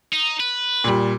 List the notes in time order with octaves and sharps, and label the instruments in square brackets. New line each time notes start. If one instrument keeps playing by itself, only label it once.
[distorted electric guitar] D#4
B4
[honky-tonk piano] A#2 G3